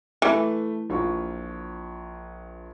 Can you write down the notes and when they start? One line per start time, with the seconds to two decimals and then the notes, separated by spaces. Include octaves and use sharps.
0.22 E3 A3 B4
0.90 A#1 F4 C#6